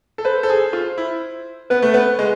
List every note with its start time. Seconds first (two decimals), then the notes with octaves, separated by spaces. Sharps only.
0.18 A4
0.25 B4 C5
0.43 A4
0.49 G#4
0.73 F4
0.98 E4
1.70 B3 B4
1.82 A3
1.94 B3 B4
2.19 G#3